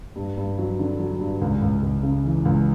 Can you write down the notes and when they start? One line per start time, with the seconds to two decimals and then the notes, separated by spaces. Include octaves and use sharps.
0.16 G2
0.37 G2
0.58 F#3
0.79 D3
0.99 F#3
1.20 G2
1.41 C#2
1.62 C#2
1.82 C#2
2.03 C#3
2.24 E3
2.45 C#2